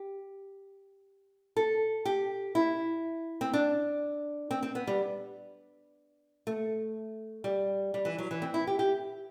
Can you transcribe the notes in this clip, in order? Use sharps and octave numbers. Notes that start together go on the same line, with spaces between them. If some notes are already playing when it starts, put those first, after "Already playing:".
Already playing: G4
A4
G4
E4
C4
D4
C4
C4
B3
G3
A3
G3
G3
E3
F#3
E3
C4
E4
G4
G4